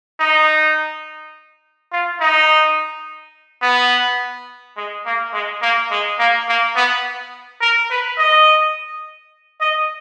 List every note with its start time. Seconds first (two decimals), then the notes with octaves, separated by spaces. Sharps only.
0.20 D#4
1.92 F4
2.21 D#4
3.62 B3
4.76 G#3
5.05 A#3
5.33 G#3
5.62 A#3
5.91 G#3
6.19 A#3
6.48 A#3
6.75 B3
7.61 A#4
7.91 B4
8.18 D#5
9.61 D#5